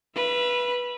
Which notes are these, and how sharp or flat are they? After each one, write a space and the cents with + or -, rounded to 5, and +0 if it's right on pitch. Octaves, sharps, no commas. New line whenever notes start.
B4 -15 E5 +35